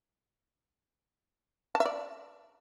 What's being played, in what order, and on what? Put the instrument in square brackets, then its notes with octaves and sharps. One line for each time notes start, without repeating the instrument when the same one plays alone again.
[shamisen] A5
E5
D5